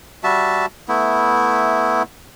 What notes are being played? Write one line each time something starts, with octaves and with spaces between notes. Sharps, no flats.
G3 F#4 E5 A5
A3 B3 E4